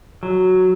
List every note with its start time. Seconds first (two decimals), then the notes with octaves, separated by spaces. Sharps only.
0.23 F#3